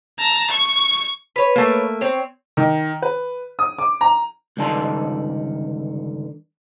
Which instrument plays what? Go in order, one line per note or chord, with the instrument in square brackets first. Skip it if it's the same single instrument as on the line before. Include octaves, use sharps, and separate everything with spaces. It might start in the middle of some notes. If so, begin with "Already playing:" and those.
[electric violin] A5 A#5
C#6
[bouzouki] B4 C#5
[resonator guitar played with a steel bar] A3 A#3
[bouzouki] C4 C#5
[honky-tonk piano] D#3
B4
D#6
D6
A#5
[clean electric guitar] C#2 G2 D3 D#3 A5 C6